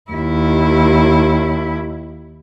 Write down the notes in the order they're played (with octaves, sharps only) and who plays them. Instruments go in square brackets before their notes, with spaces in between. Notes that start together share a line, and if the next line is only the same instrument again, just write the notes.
[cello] D#2 E4